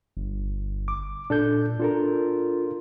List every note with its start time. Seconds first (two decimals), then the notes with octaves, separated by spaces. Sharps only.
0.17 G1
0.88 D6
1.30 A#2 D4 A4 G6
1.80 D4 F4 A4 A#4